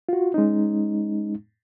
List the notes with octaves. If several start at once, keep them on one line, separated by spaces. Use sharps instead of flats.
F4 F#4
G#3 C#4 D#4